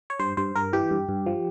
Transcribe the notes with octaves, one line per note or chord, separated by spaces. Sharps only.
C#5
G2 C5
G2 C5
G2 A#4
E3 G4
G2
G2
F3